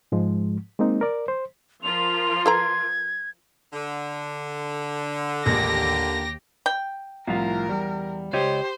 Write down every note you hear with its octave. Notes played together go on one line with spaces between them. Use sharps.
G#2 F3 G#3
G#3 A#3 C4 D#4
A#4 D5
C5
F3 F4 A#4 C6 F7
A4 B4 A#5 G#6
D3
A1 D#2 A#2 D3 G#3 A#3 G4 A#6
G5
C2 A2 F3 F4 A#4
E2 G3
C#2 G4 C5 C#5 D#5